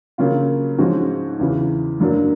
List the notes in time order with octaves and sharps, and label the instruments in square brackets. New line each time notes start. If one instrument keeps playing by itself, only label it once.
[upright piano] C#3 F#3 A#3 C#4 F4
G#2 F3 G#3 C#4 F#4
E2 C#3 E3
F#2 D3 F#3 A#3 D4